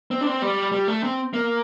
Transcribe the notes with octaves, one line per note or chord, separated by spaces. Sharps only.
C4
D4
C4
G3
G3
A3
C4
A#3